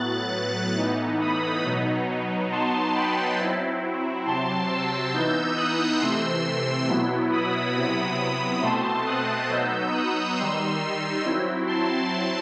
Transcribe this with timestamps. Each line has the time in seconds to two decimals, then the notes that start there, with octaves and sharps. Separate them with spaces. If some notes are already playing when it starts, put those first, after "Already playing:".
Already playing: A2 F#3 B3 F#6 A6
0.77 A2 E3 B3 D#4
1.21 B5 D#6
1.65 B2 F#3 B3 D#4
2.51 F#3 B3 D#4 A5 C6
2.96 G5 B5
3.39 F#3 C4 E4
4.26 C3 F#3 C4 A5 C6
4.70 C6 E6
5.13 E3 B3 D#4 E6 G6
5.56 D#6 F#6
6.00 C3 E3 A3 C4 C6 E6
6.87 B2 F#3 B3 E4
7.32 B5 D#6
7.75 C3 F#3 B3 E4 B5 D#6
8.19 B5 D#6
8.62 B2 A3 C4 A5 C6
9.06 D#6 F#6
9.49 F#3 B3 D#4 E6 G6
9.93 D#6 F#6
10.37 D#3 G3 D#4 C6 E6
11.25 F#3 C4 E4
11.67 A5 C6